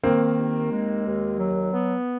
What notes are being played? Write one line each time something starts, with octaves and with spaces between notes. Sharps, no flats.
D#3 A#3 C4
D#2
G#3
D#2
F#3
B3